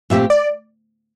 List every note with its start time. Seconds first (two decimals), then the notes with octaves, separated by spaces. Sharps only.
0.10 A#2 A3 C4 G4 E5
0.30 D5